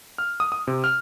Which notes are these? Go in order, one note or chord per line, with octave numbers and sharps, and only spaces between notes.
F6
D#6
D#6
C3
F6